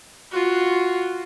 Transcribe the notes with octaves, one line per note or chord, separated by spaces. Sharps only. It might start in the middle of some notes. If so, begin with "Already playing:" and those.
F4 F#4